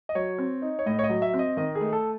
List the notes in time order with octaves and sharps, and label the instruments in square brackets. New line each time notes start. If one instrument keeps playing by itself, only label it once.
[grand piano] D#5
[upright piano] F#3 [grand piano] C#5
[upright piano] C4
D#4
[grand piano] C#5
[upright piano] A2 [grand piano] D#5
[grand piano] C#5
D#5
[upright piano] F#3
[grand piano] E5
[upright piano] C4
[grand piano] D#5
[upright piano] D#3 [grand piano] D#5
[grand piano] G#4
[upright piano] A3
[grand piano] A4